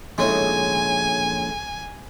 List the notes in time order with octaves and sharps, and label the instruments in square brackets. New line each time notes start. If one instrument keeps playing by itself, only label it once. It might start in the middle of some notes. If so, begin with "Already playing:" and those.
[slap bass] A#1 D#2 [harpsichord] A2 C#3 G#3 [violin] G#5